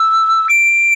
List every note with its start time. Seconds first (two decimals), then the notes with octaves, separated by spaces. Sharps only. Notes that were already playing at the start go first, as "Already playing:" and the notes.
Already playing: E6
0.49 D7